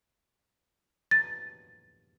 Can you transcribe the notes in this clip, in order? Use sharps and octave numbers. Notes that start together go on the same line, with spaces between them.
A6